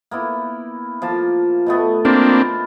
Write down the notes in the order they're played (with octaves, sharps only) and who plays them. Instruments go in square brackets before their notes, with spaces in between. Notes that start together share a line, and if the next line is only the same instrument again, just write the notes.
[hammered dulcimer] A#3 B3 E4
F3 A#3 A5
B2 A3 B3
[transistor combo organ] A#3 C4 D4 [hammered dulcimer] F4